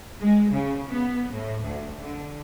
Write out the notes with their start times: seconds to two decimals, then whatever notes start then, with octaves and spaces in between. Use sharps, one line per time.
0.21 G#3
0.52 C#3
0.88 B3
1.32 A2
1.63 D2
2.00 D3